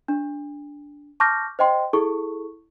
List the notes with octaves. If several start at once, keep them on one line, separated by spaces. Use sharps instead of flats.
D4
A5 C#6 D6 F6 G6 A#6
C5 D#5 G5 C6
E4 G#4 A4 C#6